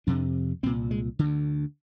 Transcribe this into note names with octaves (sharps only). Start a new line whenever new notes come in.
F2 C3 D4
C2 A#2 C4
G#3
D2 D3